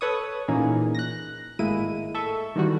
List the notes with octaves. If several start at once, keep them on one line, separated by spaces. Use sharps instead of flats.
A4 B4 C#5 C#6 D#6
A#2 E3 A#3 C#4 D#4 G#4
F#6 A#6
G#1 A2 G#3 A#3 E4 D#7
A4 E5 C#6
D#3 E3 G3 F#4